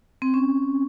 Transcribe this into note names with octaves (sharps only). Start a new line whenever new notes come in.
C4
C#4